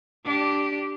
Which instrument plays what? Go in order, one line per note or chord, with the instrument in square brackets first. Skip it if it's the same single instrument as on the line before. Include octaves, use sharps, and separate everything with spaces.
[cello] D4 G4